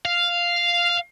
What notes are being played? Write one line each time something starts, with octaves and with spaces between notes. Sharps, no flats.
F5